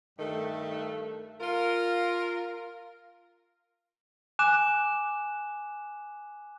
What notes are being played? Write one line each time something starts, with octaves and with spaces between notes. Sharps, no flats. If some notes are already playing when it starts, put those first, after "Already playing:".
G2 D#3 A3 A4
F4 A#4
G#5 D6 F#6 E7